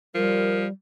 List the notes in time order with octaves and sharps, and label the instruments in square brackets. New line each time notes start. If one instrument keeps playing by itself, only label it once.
[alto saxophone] F3 [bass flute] G3 [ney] A#4